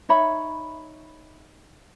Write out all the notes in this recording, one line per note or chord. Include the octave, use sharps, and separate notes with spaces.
D#4 C#5 E5 B5